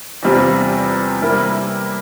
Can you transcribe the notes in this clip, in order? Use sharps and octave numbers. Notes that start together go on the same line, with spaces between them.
E2 C3 G3 C4 F4
C3 G3 A#3 E4